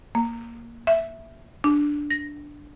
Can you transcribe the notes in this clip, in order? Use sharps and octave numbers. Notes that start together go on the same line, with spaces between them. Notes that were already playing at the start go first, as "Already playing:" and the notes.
A#3
E5
D4
A#6